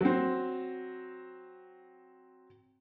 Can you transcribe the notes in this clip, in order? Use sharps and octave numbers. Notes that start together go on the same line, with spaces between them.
F#3 C4